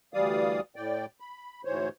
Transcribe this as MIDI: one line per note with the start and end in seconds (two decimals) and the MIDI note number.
0.14 0.60 38
0.14 0.60 52
0.14 0.60 55
0.14 0.60 74
0.14 0.60 77
0.14 0.60 87
0.76 1.06 45
0.76 1.06 74
0.76 1.06 79
1.20 1.62 83
1.65 1.89 38
1.65 1.89 44
1.65 1.89 52
1.65 1.89 72
1.65 1.89 73